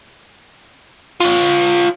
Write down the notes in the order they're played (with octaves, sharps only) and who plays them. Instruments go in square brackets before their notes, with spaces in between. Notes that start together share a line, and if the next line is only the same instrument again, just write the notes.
[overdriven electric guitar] F4 C#5